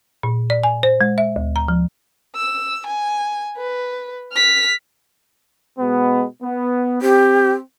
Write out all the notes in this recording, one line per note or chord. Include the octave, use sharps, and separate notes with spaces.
A#2
D5
G#5
C5
G#3
E5
D2
A#5
F3
E6
G#5
B4
F6 B6
B2 G#3 B3
B3
C4 G4